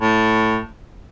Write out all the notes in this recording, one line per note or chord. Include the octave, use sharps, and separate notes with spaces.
A2